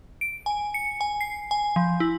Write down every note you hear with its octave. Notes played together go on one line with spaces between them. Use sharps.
D7
G#5
C#7
G#5
C7
G#5
F3
E4